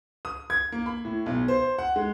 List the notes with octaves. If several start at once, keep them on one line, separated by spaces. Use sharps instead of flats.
D#6
G#6
A#3
B5
A2
B1
C5
F#5
G#3